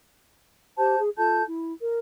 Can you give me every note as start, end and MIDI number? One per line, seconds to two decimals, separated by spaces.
0.78 0.98 67
0.78 0.98 72
0.78 0.98 81
0.78 0.98 91
0.99 1.10 68
1.17 1.42 65
1.17 1.42 69
1.17 1.42 81
1.17 1.42 91
1.47 1.72 64
1.82 1.98 70